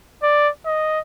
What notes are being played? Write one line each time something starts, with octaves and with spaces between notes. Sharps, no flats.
D5
D#5